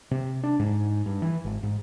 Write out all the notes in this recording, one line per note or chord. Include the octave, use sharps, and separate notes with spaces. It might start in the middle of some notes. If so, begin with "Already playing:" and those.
C3
D4
G#2
G2
E3
G#1
G#2